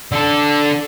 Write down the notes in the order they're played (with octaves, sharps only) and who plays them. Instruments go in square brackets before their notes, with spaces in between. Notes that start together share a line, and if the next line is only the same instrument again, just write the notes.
[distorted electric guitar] D3 A4